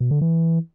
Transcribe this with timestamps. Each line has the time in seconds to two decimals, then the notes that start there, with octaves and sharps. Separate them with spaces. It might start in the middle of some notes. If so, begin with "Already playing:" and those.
0.01 B2
0.11 D3
0.21 E3